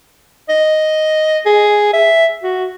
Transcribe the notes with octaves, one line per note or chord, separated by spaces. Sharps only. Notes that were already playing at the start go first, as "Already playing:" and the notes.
D#5
G#4
E5
F#4